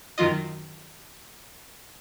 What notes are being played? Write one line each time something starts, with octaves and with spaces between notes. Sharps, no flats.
F#2 D#3 F#3 F4 D#5